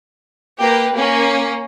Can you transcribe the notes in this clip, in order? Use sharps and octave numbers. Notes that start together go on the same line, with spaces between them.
A#3 G4 A#4 B4
A#3 C#4